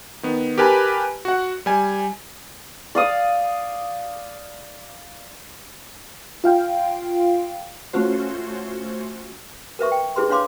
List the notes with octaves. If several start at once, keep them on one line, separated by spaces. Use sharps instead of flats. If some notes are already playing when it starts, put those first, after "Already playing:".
D#3 B3
G4 A#4 B4 G#5 A5 B5
F#4 F#5
G3 G#5
D5 F5 D#6
F4 F5 G5
A3 C#4 F4 F#4 C5
A#4 B4 E5 C#6
G5
E4 G#4 B4 C6
D4 B4 C#5 F5 C6 D6